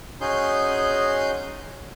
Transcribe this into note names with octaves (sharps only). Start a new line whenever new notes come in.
C#4 D#4 F#4 G#4 C6 G6